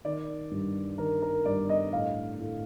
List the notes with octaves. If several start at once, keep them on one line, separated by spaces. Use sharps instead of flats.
D#3 D5
G2
D#3 A#4
A#4
G2 D5
D#5
A2 F5
A2